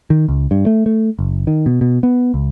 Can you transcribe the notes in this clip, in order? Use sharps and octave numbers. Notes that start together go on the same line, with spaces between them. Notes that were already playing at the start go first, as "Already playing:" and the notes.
D#3
C#2
G2
A3
A3
F#1
D#3
B2
B2
B3
C#2